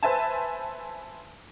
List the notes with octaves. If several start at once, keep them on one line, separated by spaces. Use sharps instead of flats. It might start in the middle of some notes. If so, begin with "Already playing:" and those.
B4 C5 E5 G#5 A5